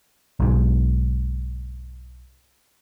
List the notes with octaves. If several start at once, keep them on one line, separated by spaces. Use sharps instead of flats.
B1 G#2